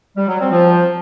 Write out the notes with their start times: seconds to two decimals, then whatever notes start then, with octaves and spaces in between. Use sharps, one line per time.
0.17 G3
0.28 F#3
0.40 C4
0.51 F3